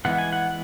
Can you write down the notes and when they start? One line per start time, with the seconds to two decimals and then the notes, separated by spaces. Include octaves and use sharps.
0.05 E3 G#3 B3 F#5
0.18 G#5
0.33 F#5